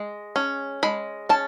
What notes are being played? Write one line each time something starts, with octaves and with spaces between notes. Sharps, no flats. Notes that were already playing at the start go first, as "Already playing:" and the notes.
Already playing: G#3
C#4
G#3 B5
C#4 A5